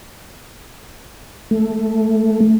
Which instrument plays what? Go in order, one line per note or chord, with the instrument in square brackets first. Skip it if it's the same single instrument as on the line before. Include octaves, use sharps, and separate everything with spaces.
[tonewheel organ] A3